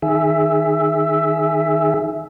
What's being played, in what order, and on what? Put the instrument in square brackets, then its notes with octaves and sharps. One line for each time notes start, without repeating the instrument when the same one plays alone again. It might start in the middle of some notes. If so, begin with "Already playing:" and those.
[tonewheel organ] D#3 G#4 E5